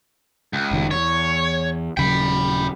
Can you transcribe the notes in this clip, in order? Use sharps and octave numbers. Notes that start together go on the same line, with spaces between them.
C#2
F1 D#3
E2 C#5
D#1 C#3 F#3 G5 B5